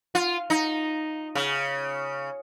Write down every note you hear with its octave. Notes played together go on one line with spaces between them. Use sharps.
F4
D#4
C#3